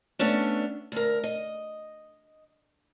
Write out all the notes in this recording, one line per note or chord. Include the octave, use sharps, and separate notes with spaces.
A3 B3 C#4 D4
D2 A#4
D#5